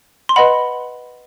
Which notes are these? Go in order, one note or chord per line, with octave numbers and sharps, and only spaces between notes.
C6
B4 D#5 F#5 B5